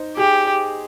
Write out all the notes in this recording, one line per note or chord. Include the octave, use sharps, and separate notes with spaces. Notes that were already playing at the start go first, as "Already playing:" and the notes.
Already playing: D#4 C5
G4 G#4